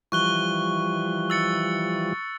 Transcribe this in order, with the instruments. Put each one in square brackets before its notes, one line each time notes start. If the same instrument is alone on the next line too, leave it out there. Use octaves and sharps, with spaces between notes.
[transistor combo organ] E3 F3 G3 [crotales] C#6 F#6 G7
[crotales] E6 A6 C#7